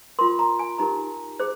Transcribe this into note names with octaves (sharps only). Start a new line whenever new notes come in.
F4 A#4 C6
A#5
G#5
D#4 G4 A#4 A#5
G#4 C5